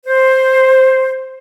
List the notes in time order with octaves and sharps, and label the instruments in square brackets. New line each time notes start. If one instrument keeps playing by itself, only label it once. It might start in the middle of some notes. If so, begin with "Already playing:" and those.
[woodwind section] C5